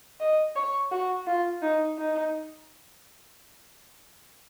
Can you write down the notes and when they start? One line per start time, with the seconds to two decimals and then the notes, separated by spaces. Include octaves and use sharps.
0.20 D#5
0.56 C#5
0.92 F#4
1.27 F4
1.62 D#4
1.98 D#4